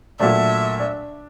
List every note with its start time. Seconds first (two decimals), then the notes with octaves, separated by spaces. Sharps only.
0.20 A#2 F#3 A3 D4 E5
0.79 D4